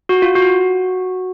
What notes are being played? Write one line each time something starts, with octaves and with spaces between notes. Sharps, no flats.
F#4
F4
F#4